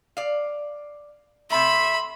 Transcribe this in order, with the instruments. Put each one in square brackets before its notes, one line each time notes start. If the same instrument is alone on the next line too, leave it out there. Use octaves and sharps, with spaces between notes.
[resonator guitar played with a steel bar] D5 F5
[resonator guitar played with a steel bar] C3 A3 [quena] E5 [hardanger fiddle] B5 [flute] C6